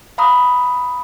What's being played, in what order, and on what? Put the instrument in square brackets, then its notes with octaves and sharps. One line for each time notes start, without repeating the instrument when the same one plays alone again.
[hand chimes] F5 A#5 B5 D#6